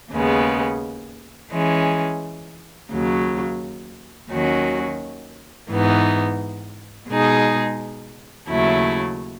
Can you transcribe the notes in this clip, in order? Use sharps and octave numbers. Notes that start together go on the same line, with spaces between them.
D#2 C#3 G#3 B3
E3 G#3 C#4
D#2 C#3 F#3
D#2 D#3 F#3 C#4 F#4
G#2 E3 B3 D#4
B2 G#3 D#4 G#4
D#2 C#3 F#3 A3 E4